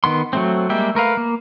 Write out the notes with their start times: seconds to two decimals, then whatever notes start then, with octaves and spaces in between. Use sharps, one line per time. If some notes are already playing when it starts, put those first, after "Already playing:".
0.04 D#3 B3 C6
0.33 F#3 A3 C4
0.69 G3 G#3 A#3 E5 G5
0.95 A3 A#4 B4 F5
1.17 A#3